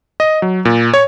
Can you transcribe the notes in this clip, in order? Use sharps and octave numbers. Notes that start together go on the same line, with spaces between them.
D#5
F#3
A#2
C#5